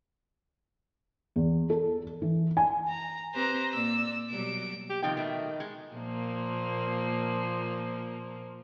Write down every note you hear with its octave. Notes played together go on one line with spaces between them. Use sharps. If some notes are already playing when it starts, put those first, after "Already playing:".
E2
A4
E3
G#5
A#5
C4 G4 B4 C5 A#5
A#2 A#3 D5 E6
B2 F#3 G3 D7
G4
C3 D#3 F3 G5
B2 A3
G#3
A#2 F3 A#3